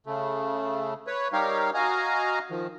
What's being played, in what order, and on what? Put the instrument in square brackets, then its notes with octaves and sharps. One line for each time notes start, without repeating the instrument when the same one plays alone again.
[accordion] C#3 A3
B4 C#5
G3 D#4 G4 A#4 C#5 F5
F#4 D#5 F5 G#5 A#5
D#3 F3